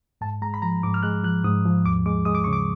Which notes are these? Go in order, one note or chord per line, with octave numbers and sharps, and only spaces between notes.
G#2 A5
G#3 A#5
B5
F3 A#5
G#2 D6
F6
G#3 F#6
F3 F#6
G#2 D#6
F3
D#2 D6
G#3 D6
G#3 D#6
D6
C#3 C#6
D6